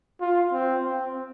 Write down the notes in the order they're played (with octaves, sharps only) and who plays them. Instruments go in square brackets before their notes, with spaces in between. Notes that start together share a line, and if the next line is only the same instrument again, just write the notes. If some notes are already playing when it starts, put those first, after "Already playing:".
[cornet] F4
C4
C4